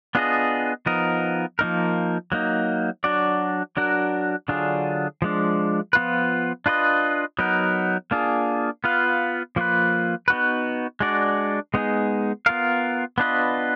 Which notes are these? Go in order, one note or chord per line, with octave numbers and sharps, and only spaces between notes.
B3 D4 F4 G#4 D#5
F3 B3 D#4 A#4 D#5
F3 A#3 D#4 A#4
F#3 A#3 D#4
F#3 D4 F#4 D5
F#3 D4 F#4 A#4
D3 F#3 D4 F4 G#4
F3 G#3 D4
F3 B3 F4 B4
D4 F4 B4 D#5
F#3 B3 D#4 A#4
A#3 D4 F4 G#4
B3 F4 B4 F5
F3 A#3 F4 B4
B3 D#4 F#4 B4
G#3 D4 F#4 D5
G#3 B3 D#4 G#4
B3 F4 A#4 F5
B3 D4 F4 B4 D#5